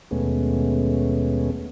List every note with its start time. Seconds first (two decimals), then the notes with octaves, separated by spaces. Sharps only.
0.11 D#2 B2 G#3 A3 B3 C#4